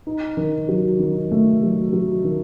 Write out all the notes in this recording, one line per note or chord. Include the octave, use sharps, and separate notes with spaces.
D#4
D#3
F#3
D#3
A3
F#3
F#3
D#3